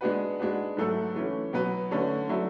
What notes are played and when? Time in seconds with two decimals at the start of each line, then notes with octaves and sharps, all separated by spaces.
0.01 G#3 B3 D4 F#4 B4
0.39 G#3 D4 F#4 B4
0.77 G#2 F#3 A3 E4 A4
1.15 E3 A3 C#4
1.53 B2 F#3 B3 F#4 B4
1.91 D3 A3 C#4
2.29 D3 F#3 A3 E4